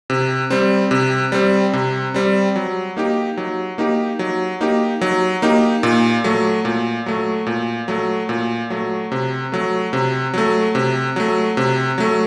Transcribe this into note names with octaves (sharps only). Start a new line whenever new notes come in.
C3
G3 C4
C3
G3 C4
C3
G3 C4
F#3
A#3 D#4 G4
F#3
A#3 D#4 G4
F#3
A#3 D#4 G4
F#3
A#3 D#4 G4
A#2
F#3 A3
A#2
F#3 A3
A#2
F#3 A3
A#2
F#3 A3
C3
F#3 A3
C3
F#3 A3
C3
F#3 A3
C3
F#3 A3